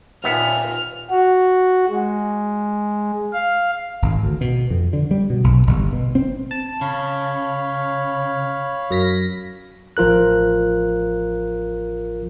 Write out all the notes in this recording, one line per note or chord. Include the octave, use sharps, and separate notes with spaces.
D#2 A#2 B3 E5 F6
F#4
G#3
F5
G#1
D2
B2
F2
D3
G3
B2
B1
G1
B2
C4
A5
C#3 C#5 F5 B5
F#2 A#6 B6
A1 F3 F4 A#4 F#6